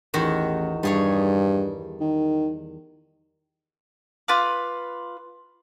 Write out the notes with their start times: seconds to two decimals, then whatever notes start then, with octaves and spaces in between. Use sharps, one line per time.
0.14 A1 E2 D#3 F#4
0.83 G2 G3 G#4 C#5
2.00 D#3
4.28 F4 B4 D6